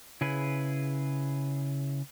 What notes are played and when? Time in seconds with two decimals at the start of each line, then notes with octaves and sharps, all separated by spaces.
0.21 C#3 E4 G#4 B4